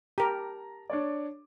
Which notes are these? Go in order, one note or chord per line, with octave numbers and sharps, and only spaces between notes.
G4 A#4 A5 A#5
D4 C#5 D5